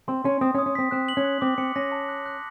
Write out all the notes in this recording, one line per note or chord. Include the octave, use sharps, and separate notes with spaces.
C4 C6
C#4 C6
C4 D#6
C#4
D#6
C#4
C4 B6
C4 F#6
F#7
C#4
F#6
C4 D6
C4 C#7
C#4 A#6
A5
F#6
F#6